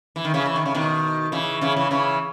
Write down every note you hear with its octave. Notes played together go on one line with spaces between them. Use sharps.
E3
D#3
C#3 E3
E3
D#3
C#3
B2 D#3
C#3 E3
C#3 E3
C#3 E3
C#3 E3